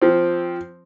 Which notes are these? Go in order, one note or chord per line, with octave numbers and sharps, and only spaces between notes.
F3 C4